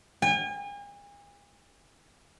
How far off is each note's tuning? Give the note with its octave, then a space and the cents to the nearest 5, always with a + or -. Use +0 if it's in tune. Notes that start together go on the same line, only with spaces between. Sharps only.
G#5 -40